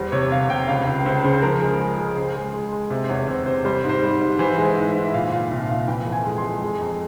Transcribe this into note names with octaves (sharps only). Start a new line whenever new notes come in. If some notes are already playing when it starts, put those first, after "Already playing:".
Already playing: E2 G3 C5
C3 C#5
C3 F5
C3 G5
C#2 F5
C#2
C#2 C5
C#3 C5
F3 A#4
G#3
G#3
G#3
C#2 C5
G#3
G#3
G#3
C3 E5
C5
E2 C#5
C3 C5
C3 C5
G3 C5
G#2
C5
G3
G#2
E3 C5
G#3
C5
G#2
E5
G#2
A#2 F5
A#2 F5
C2 E5
A#2 F5
E3 G5
F2
G#5
G#3
G#3 C6
G#3
F2